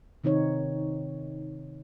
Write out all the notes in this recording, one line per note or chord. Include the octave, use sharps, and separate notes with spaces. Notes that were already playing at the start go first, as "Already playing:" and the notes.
C3 D#3 C4 D#4 C#5